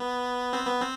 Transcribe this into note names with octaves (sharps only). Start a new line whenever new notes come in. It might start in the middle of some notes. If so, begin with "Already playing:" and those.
Already playing: B3
C4
B3
C4